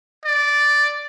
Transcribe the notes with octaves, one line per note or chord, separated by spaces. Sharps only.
D5